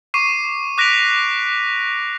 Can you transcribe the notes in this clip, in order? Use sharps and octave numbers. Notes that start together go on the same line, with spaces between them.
C#6 D6 C7 D#7
D6 F#6 A#6 B6 D7 F7